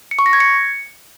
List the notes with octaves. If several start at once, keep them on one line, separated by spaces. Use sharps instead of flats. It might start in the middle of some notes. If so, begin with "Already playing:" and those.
C#7
C#6
A#6
G#6
C#7